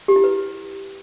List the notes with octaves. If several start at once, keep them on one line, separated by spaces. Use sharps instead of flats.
G4
E4
B4